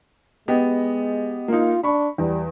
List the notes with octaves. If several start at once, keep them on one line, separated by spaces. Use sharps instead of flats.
G#3 B3 G4 D#5
A#3 D#4 F4
D4 B5 C#6
E2 G3